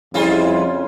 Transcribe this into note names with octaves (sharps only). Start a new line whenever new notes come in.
F2 C#3 G3 E4 F4 G#4